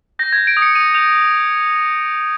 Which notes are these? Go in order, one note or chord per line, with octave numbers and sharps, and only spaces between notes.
G6 A#6
G#6
G6
D7
D#6
C#7
D#6 D#7
G6 F7